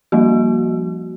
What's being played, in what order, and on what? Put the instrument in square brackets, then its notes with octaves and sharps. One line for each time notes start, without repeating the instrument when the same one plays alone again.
[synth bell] F3 G3 A#3 F#4